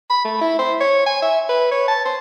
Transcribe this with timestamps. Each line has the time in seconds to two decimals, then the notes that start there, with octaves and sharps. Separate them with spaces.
0.10 B5
0.25 A3
0.41 E4
0.59 C5
0.81 C#5
1.06 G#5
1.22 E5
1.49 B4
1.71 C#5
1.88 A5
2.05 C5